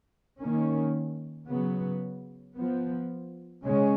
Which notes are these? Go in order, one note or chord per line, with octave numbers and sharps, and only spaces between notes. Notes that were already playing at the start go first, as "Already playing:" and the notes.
D#3 A#3 C#4
C#3 F#3 B3
F3 B3
C#3 G#3 C#4